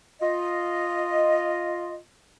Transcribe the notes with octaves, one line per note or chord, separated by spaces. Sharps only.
F4 D#5